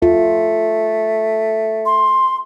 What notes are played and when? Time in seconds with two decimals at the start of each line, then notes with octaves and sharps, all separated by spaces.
0.02 A3 F4
1.86 C6